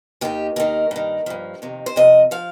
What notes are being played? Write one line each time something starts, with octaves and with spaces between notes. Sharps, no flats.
D#2 D#3 G4
D#2 D#3 A#4
G2 D#3
G2 F3
F2 C3 D#3
C5
F2 C3 D#5
F3 F5